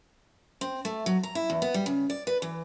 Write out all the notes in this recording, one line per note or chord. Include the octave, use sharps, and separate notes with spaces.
C4
A3
F#3
A#5
E4
E2
B3
G3
C#3
D5
B4
E3